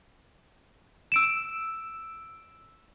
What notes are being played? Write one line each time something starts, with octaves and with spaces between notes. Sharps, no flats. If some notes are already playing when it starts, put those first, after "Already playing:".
E6 D7 E7